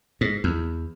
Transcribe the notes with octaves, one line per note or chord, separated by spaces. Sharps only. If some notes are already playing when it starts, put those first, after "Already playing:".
G#2
E2